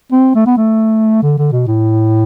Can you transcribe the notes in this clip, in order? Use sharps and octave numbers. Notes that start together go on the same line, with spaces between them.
C4
A3
B3
A3
D3
D3
B2
A2